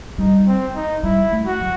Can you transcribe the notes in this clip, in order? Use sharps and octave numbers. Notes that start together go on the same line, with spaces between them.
G3 D#4
C4
D#4
G3 E4
A3
F#4
F#3